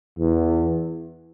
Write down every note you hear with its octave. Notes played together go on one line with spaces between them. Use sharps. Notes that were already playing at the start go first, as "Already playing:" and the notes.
E2